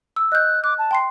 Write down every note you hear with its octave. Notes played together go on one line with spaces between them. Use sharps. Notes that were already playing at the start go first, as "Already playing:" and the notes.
E6
D#5 F#6 G6
D6 F#6
A5
G5 C6 C7